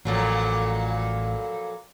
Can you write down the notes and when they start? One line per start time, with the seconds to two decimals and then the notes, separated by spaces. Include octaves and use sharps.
0.05 A1 F2 A#2 F#3